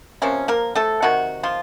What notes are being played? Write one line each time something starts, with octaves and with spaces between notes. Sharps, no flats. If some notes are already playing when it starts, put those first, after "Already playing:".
C3 F3 A#3 C#4
A#3 A#4
A3 A4
C3 D#3 F#3 F#4
F3 F4